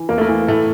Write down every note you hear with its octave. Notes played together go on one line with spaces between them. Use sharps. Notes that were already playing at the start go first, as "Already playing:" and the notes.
Already playing: E3
E2 A#3
A3
A#3
E3
A2 A3